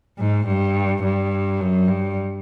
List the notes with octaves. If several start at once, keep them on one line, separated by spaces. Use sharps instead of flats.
G#2
G2
G2
F#2
G2